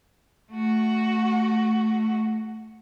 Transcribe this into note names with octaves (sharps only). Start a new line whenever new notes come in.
A3 F#4